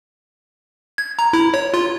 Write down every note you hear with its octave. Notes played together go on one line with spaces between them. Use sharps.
G#6
A#5
E4
C#5
F4